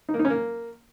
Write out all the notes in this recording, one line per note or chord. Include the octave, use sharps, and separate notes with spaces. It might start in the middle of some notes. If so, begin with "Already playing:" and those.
D#4
A#3
D#4
C#4
A#3